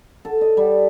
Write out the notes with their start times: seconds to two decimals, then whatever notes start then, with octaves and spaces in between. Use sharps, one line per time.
0.25 A4
0.41 D#5
0.57 G3